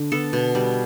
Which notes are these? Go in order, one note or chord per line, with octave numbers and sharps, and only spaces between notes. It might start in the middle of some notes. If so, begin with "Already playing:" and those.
Already playing: D3
B3 A4
B2
G3